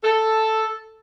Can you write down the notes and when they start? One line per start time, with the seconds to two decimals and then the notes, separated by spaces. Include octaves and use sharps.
0.04 A4